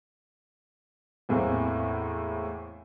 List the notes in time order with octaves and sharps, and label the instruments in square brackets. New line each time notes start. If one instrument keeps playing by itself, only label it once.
[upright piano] E2 A2 E3 A#3 C4